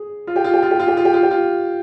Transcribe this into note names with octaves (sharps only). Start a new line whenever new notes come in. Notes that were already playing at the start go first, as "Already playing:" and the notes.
Already playing: G#4
F4
G4
F4
G4
F4
G4
F4
G4
F4
G4
F4
G4
F4